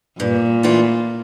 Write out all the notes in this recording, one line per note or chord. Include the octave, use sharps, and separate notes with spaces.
G2 A#2
E3 A3 D4 F4